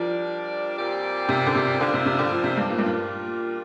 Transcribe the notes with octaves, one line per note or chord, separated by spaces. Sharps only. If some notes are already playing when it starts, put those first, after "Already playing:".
Already playing: F3 G3 D4 A#4 D5
A#2 G3 C4 G4 D5
C3
D3
C3
D3 G3 A#3 D4 F4 C5
C3
C3
D3
F3
C3
G2
A#2
G2
A#2 G3 D4 F4